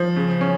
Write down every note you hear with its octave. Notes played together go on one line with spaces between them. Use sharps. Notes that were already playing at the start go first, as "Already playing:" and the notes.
Already playing: F3
C#3
C#4